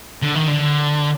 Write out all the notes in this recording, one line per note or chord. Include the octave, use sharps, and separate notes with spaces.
D3
D#3
D3